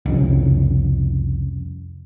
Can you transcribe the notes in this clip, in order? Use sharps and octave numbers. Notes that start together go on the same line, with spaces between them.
C2 F2 C#3